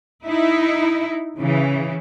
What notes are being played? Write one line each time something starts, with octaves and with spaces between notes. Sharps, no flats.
D#4 E4
C#3 E3